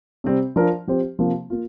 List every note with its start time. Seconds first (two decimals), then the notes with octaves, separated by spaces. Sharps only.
0.24 C3 G3 C4
0.56 F3 D4 A#4
0.87 F3 C4 G4 C5
1.18 C3 F3 A#3
1.50 A#3 F4